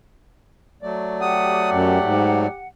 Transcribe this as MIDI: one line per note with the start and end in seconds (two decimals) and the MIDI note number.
0.83 2.48 54
0.83 2.48 57
0.83 2.48 74
1.21 2.68 67
1.21 2.68 78
1.21 1.70 87
1.72 1.99 42
2.04 2.47 44